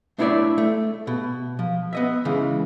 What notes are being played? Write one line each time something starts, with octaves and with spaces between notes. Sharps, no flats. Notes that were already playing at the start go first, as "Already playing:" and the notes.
A3 D4 E4 C#5 D5 E5
A3
B2
F3
B3 D#5 E5
C#3 E3 G#3